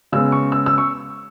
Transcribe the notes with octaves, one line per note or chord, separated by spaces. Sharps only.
C#3 G#3 B3 E6
C#6
E6
E6
C#6